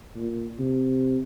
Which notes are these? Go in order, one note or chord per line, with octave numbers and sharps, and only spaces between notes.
A#2
C3